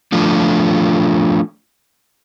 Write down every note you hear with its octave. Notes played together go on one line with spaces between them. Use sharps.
F3 A3 D4 F4